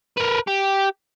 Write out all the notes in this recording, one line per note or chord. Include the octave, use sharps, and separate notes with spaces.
A#4 B4
G4